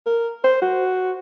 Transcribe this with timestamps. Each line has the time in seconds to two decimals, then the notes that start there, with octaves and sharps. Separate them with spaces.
0.06 A#4
0.44 C5
0.62 F#4